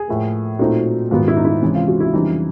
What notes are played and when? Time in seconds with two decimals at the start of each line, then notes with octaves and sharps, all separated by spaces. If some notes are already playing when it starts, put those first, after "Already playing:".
Already playing: G#4
0.08 A2 F3 A#3
0.59 A#2 F#3 A3 C4 D#4 F#4
1.11 G#2 D#3 F#3 B3 F4
1.28 E4
1.37 D#4
1.45 E4
1.62 C3 E3 G#3 C#4
1.75 F4
1.88 F#4
2.00 E4
2.13 F2 C#3 E3 G3 D#4